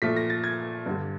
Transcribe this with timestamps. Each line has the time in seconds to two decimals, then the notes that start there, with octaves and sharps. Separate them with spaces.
0.02 A#2 F3 A3 B6
0.16 A#6
0.30 A6
0.44 G#6
0.86 G2 D3 G3